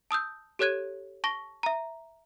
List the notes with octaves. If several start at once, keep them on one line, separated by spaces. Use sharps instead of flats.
A5 D#6 E6 G6
G4 A4 C#5 F#6 G#6 D#7
A5 C#6 A#6 G7
E5 A#5